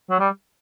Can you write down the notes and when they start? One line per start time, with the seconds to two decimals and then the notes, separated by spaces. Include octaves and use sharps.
0.10 F#3
0.19 G3